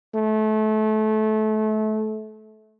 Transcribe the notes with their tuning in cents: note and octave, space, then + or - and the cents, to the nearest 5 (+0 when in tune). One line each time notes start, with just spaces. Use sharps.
A3 -25